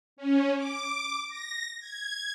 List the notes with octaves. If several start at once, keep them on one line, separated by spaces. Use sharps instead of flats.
C#4
D6
A#6
G#6